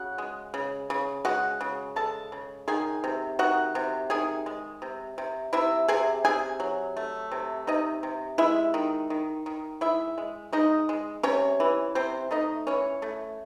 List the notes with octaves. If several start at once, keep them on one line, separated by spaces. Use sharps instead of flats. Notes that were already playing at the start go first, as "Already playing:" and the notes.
Already playing: C#3 F#4 F#5
G#3
C#3
C#3
G#3 F#4 F#5
C#3
G#3 A4 A5
C#3
D#3 G#4 G#5
C3
D#3 F#4 F#5
C3
D#3 G#4 G#5
G#3
C3
C3
C3 E4 E5
C3 G#4 G#5
C3 G#4 G#5
F#3
A3
C3
C3 D#4 D#5
C3
G#3 E4 E5
D#3
D#3
D#3
G#3 E4 E5
G#3
G#3 D#4 D#5
G#3
C3 C#4 C#5
E3
C3 C4 C5
A3 D#4 D#5
E3 C#4 C#5
A3